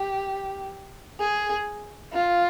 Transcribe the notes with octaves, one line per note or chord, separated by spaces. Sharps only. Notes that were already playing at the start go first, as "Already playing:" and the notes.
Already playing: G4
G#4
F4